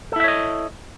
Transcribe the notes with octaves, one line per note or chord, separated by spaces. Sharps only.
E4 A4 C#5 D#5 E5